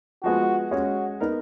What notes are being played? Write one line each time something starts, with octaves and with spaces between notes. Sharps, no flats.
F3 G#3 B3 F#4
G#3 C#4 F#4 G#4 C#5
B3 D#4 A#4